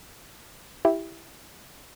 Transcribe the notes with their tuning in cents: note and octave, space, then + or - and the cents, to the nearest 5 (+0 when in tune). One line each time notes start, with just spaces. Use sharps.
E4 +0 G4 +0